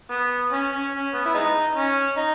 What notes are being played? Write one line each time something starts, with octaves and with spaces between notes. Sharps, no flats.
B3
C#4
C#4
C#4
B3
E4
G#3 B3 D#4
C#4
D#4